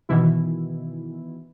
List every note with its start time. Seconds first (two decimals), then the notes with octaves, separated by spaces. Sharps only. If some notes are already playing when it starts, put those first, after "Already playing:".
0.09 B2 D#3 E3 E4